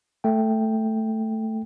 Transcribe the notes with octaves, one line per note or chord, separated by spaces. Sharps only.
A3 G5